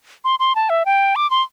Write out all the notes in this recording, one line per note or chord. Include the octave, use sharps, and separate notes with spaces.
C6
C6
A5
E5
G5
D6
C6